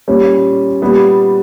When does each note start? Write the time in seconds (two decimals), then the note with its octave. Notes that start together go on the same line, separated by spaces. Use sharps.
0.08 A#2 G3 C#4
0.82 A#2 G3 B3